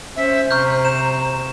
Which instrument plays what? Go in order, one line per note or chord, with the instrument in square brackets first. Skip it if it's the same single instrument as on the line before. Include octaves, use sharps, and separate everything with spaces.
[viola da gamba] C#4 [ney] C5 [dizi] E5
[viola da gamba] C3 [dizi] A#5 [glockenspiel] C#6 F6 G6
[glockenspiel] E7